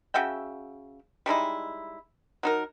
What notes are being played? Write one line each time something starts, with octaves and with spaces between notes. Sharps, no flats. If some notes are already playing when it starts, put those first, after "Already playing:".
C#3 F#4 E5 G5
G3 G#3 D#4 E4
F#3 D#4 A#4